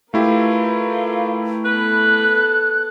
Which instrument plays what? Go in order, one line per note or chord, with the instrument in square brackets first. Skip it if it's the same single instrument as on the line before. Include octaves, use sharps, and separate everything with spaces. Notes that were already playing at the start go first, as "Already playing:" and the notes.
[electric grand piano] A3 E4 G4 [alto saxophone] F4 [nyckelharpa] A#4 B4
[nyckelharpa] B3 A4 [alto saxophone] B4 [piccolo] F#6